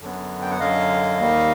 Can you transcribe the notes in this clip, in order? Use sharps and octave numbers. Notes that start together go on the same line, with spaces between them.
F#2 D3 F#3 B3
G5
F#5
F#2 D3 F#3 D#5 F5
D#2 D#3 G3 A#3